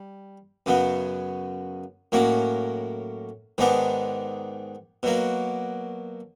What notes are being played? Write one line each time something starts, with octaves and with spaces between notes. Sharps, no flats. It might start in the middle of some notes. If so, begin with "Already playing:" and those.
Already playing: G3
F#2 C#3 F#3 B3
A2 F#3 A#3 C#4
G#2 D#3 G#3 B3 D4
B2 F#3 A#3